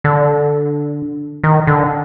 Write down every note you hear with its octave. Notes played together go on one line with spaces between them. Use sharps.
D3
D#3
D3